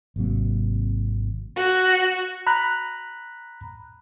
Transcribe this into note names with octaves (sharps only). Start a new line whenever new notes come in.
G#1 C3 F#3 A#3
F#4
A#5 B5 F#6